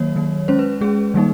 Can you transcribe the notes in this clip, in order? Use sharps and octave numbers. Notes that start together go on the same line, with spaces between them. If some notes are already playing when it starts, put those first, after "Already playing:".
Already playing: D#3 F#3 A#3 C#5
D#3 F#3 A#3
G#3 C#4 C5
B4
G#3 C#4 G#4
D#3 G3 A#3 D#4